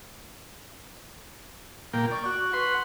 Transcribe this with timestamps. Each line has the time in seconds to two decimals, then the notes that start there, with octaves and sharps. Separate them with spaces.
1.93 A#2 A#3 G5
2.11 D5 C#6
2.26 F#4
2.53 B4 F#5 C6